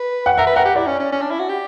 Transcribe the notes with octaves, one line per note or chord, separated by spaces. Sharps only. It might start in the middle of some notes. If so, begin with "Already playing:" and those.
Already playing: B4
F#5
A#4 E5
B4
A#4 F#5
G4
E4 D5
C#4
C#4
C#4
D4
E4
F#4
G4